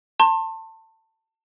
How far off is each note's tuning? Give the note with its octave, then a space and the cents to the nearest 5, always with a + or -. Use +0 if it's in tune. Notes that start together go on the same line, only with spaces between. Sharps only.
A5 +25 C6 +30